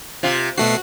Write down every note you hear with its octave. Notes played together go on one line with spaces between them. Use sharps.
C3 F4
B2 A3 F#4 C7